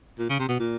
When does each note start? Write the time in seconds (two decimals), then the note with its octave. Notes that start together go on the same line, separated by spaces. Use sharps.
0.19 A#2
0.30 C#3
0.40 C3
0.49 B2
0.60 A#2